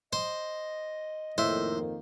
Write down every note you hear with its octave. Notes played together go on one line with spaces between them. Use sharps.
C5 D#5
F2 A2 D#3 A#3 C5 E5